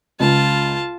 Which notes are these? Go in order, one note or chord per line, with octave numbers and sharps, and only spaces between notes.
C#2 F4 A5